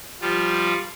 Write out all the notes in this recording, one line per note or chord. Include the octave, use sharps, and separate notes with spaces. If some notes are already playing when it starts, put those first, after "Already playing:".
F3 G3 F4